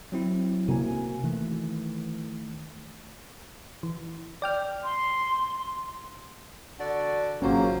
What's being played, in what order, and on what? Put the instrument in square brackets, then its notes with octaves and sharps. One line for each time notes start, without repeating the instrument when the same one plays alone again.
[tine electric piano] F#3 C4 E4
[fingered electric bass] C3 A#3 [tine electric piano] F#4 G#5
[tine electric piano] D#3 A3 [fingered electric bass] E3
[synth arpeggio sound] E3
D5 G5 F6
[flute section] C6
[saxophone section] D3 F#4 D5
[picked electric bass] G#1 C#4 [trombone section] C#3 F#3 A#3 [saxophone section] F3 C5